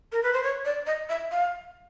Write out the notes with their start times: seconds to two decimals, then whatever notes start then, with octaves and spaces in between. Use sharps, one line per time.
0.12 A#4
0.23 B4
0.33 C5
0.43 C#5
0.65 D5
0.87 D#5
1.09 E5
1.31 F5